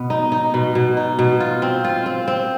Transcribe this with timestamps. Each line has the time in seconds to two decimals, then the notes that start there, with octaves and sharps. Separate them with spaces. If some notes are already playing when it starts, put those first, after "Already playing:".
Already playing: B2 B3
0.10 D#4
0.32 D#4
0.54 B2
0.75 B2
0.97 D#4
1.19 B2
1.40 F4
1.62 C4
1.84 F4
2.06 C4
2.28 C4